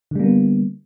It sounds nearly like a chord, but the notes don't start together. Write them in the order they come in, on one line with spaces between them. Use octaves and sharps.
D3 G3 A#3 B3